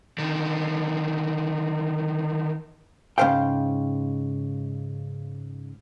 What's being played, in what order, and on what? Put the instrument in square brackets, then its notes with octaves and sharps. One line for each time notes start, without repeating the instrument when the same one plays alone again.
[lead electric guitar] D3 D#3
[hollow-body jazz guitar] G#2 C#3 A#3 C5 F5 G5